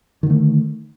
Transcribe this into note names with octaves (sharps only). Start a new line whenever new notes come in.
D3 D#3 A3